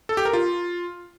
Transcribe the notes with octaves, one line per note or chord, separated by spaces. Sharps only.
A4
G4
A#4
F4